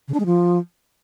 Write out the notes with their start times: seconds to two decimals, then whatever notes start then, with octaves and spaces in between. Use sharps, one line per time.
0.08 C#3
0.14 D4
0.20 G#3
0.26 F3